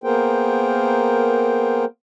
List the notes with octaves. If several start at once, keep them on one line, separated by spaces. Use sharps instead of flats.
A#3 B3 G#4 A#4 C5 G5